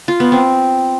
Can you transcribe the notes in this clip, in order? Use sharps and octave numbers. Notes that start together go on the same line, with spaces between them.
F4
B3
C4